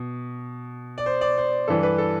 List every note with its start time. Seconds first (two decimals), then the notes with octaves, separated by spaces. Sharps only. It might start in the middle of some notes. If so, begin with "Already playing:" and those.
Already playing: B2
0.98 D5
1.06 C5
1.21 D5
1.38 C5
1.68 G2 E3 G3 A4
1.83 B4
1.98 A4